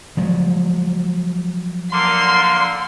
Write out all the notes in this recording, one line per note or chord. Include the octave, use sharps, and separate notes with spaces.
F3 F#3 G#3
D3 A#3 C6